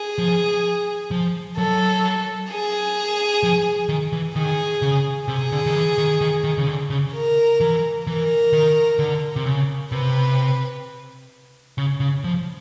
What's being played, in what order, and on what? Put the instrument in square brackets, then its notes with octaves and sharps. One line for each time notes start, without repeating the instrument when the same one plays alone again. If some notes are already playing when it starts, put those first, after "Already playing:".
Already playing: [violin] G#4
[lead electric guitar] F3
F3
[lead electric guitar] F#3 [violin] A4
[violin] G#4
[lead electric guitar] F3
D#3
E3
[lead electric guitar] D#3 [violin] G#4
[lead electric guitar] C#3
[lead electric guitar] C3 [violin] G#4
[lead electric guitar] D3
D#3
E3
D#3
D#3
D#3
C#3
D3
C#3
[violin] A#4
[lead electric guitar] E3
[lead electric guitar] E3 [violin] A#4
[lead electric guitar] D#3
D3
C3
C#3
[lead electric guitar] C3 [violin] B4
[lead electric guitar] C#3
C#3
F3